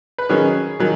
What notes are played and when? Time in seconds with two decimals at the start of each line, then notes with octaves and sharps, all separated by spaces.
0.18 B4
0.29 D#3 F#3 C#4 G#4
0.80 D#3 F#3